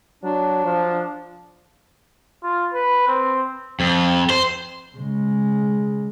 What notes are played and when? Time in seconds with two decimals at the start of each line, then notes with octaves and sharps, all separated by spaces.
0.23 F#3 D4
0.65 F3
2.43 F4
2.73 B4
3.08 C4
3.80 F2
4.30 C5
4.96 C#3 G#3